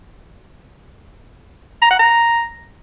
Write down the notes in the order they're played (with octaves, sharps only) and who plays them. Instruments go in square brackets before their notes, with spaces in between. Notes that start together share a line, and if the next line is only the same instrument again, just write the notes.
[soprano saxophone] A#5
F#5
A#5